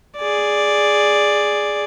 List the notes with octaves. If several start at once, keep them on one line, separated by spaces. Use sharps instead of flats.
G#4 D5